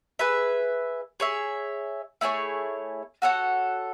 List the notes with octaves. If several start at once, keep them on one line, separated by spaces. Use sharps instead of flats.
G#4 B4 E5
G#4 C#5 E5
A3 E4 G#4 C#5
F#4 A4 C#5 F#5